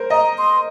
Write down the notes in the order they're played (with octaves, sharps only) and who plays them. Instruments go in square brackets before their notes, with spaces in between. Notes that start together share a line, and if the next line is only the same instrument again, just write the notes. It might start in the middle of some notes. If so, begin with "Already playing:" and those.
Already playing: [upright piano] A#4 C5
[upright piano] D#5 [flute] A#5
[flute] C6